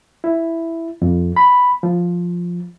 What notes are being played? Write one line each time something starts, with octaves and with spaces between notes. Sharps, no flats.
E4
F2
B5
F3